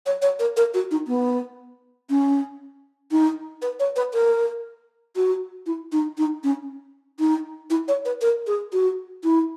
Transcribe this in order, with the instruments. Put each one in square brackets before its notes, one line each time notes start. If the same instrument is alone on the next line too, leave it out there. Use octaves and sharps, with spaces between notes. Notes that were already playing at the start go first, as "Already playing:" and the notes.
[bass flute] C#5
C#5
A#4
A#4
F#4
D#4
B3
C#4
D#4
B4
C#5
B4
A#4
F#4
E4
D#4
D#4
C#4
D#4
E4
C#5
B4
A#4
G#4
F#4
E4